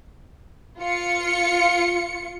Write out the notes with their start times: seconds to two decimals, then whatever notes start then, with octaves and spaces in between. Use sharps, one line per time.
0.80 F4 C#7